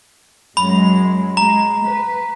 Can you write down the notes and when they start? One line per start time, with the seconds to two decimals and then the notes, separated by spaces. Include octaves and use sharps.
0.57 F#2 F#3 G#3 B5
1.37 G#3 A#5
1.87 B4